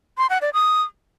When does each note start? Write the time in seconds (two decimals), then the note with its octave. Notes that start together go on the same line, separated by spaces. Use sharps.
0.18 C6
0.30 F#5
0.42 D5
0.54 D#6